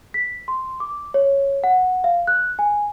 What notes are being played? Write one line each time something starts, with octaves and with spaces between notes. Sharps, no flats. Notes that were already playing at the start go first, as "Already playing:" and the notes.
B6
C6
D6
C#5
F#5
F5
F#6
G#5